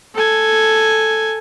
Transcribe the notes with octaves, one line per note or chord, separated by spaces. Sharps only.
A4 G#5